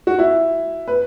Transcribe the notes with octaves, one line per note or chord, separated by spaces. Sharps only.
F#4
E4
B4